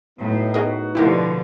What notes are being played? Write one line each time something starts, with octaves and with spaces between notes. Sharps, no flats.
A2 F#3 B3 D#4
B3 D#4 F#4 G#4 A#4 D#5
B2 D3 F3 E4 G4 A#4